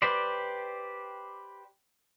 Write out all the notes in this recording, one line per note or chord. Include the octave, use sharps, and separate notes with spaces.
G4 B4 C5 D5